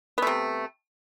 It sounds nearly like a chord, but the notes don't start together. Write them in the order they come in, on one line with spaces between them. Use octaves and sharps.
B3 A3 C3